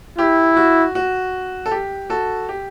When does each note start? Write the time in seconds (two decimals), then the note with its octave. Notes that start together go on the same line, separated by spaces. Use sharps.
0.18 E4 G4
0.57 F#4
0.95 F#4
1.66 A4
1.71 G4
2.10 F#4 A4
2.49 G4